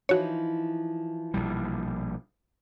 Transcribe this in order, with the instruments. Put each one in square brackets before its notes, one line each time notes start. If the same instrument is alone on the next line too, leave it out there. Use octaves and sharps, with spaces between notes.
[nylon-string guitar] E3 F3 D#4 [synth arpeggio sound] F#4 C#5
[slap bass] A#1 B2 G3